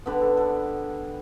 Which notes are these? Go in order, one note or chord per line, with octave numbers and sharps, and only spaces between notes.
D3 G3 B3 B4
A4
A4